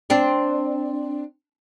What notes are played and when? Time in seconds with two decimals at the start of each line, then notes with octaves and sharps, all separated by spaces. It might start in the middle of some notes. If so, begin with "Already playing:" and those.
0.10 C4 D4